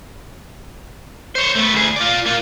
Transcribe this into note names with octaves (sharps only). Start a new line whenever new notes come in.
C5 C#5
A3 B3
D2 G#4
F4 D5
A#3 F4